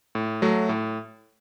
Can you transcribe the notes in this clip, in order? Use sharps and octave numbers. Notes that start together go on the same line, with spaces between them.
A2
F#3 A3 F#4
A2